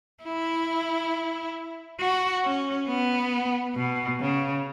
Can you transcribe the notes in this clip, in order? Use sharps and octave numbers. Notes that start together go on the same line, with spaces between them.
E4
F#4
C#4
B3
B2
C#3